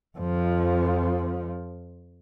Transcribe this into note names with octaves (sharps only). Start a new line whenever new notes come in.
F2 F3